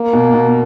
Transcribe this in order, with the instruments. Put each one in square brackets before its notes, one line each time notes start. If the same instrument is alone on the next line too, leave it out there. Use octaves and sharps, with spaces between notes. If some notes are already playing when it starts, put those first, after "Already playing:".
Already playing: [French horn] A#3
[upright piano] B2
B2